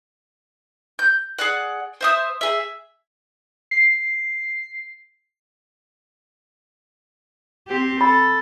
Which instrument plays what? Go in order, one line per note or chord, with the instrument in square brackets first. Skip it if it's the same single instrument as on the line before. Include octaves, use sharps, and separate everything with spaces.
[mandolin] G6
G#4 D5 F#5
C5 E5 D#6
G#4 E5
[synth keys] C7
[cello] C4 G4
[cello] A4 [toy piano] B5